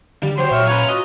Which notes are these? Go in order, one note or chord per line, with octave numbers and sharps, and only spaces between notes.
D3 G3 G4
F#3 G4 C5 C6
A#2 C#5 E5 F6
C#4 F4 B4 C#5 A#5
F#4 D#5